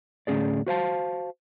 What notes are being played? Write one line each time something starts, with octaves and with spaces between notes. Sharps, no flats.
D2 A2 C#4 G#4 D5
F#4 C5 F5 A5